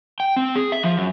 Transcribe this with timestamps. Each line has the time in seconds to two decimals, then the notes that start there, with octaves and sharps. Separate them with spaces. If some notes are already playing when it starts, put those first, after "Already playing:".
0.20 G5
0.36 C4
0.55 G#4
0.72 E5
0.83 F3
0.97 F#2